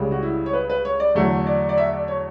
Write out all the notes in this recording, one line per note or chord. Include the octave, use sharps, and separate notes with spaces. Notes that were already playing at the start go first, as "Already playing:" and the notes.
Already playing: C#2 C#3 G3
F#4
E4
C#5
B4
B4
C#5
D5
E2 D3 F#3 A3
D5
D5
E5
D5
C#5